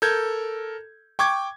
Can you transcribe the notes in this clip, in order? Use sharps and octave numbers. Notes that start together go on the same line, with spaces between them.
A4 A#4 G6 G#6
G5 C#6 D6 G#6